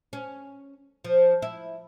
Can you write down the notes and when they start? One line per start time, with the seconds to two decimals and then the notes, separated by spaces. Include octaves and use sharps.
0.13 C#4
1.04 F3
1.42 E4